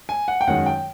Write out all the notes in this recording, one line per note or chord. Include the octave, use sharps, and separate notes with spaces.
G#5
F#5
G5
F#2 D#3 G#3 F#5
G5